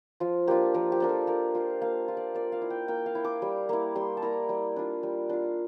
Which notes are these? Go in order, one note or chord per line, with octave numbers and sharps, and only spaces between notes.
F3 F4
A#3 D4 F4 G4
F3 A#4
G4
A#3 D4 F4 A#4
A4
A#3 A#4
F4 C5
A#3 F5
F4
D5
A#3 D5
F5
E4
G5
A#3 G5
F5
E4
D6
G3
A#3 E4
G3 C6
A5
A#3 E4 A#5
G3
D4 F4
G3
D4 F4